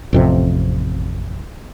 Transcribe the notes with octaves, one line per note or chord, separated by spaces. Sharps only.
A1 F2 C3